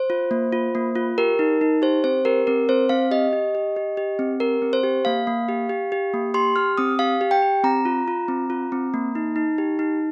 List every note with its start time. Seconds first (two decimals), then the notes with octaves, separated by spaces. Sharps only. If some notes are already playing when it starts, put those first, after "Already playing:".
Already playing: C5
0.10 F4
0.31 A#3
0.53 F4
0.75 A#3
0.95 F4
1.18 G4 A#4
1.39 D#4
1.61 D#4
1.82 G4 C5
2.04 C4 C5
2.25 G4 A#4
2.47 C4 A#4
2.69 C4 C5
2.89 C4 F5
3.11 G4 D#5
3.33 G4
3.55 G4
3.76 G4
3.97 G4
4.19 C4
4.40 G4 A#4
4.62 C4
4.73 C5
4.83 G4
5.05 A#3 F5
5.27 A#3
5.49 G4
5.69 G4
5.92 G4
6.14 A#3
6.34 G4 C6
6.56 G4 F6
6.78 C4 D#6
6.99 G4 F5
7.21 G4
7.31 G5
7.42 G4
7.64 C4 A#5
7.85 F4
8.08 F4
8.28 C4
8.50 F4
8.72 C4
8.94 A#3
9.15 D#4
9.36 D#4
9.58 G4
9.79 D#4